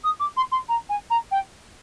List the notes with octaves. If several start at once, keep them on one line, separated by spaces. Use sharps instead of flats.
D#6
D6
C6
C6
A#5
G#5
A#5
G5